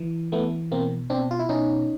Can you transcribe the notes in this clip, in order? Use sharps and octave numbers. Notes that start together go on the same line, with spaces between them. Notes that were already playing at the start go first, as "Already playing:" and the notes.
Already playing: E3
E3 A3 B3
B2 A#3 C4
B2 C4 D4
F4
E4
B2 C#4 D#4